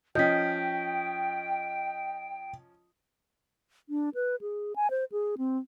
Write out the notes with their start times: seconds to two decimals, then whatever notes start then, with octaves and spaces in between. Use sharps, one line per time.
0.15 F3 C#4 D#5 G5 G6 B6
3.89 D4
4.15 B4
4.41 G#4
4.76 G#5
4.90 C5
5.12 G#4
5.38 C4